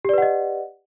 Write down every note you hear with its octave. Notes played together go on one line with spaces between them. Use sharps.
G4 B4 D5 D#5 F#5